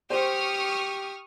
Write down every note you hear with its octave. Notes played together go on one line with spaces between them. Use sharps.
G4 C5 C#6 D#6 F6